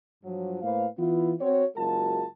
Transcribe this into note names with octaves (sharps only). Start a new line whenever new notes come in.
G2 F3 F#3
A2 A#3 B4 C5 F5
E3 B3 E4 F4
C4 F#4 C#5
F#1 G#3 F4 F#4 A#4 A5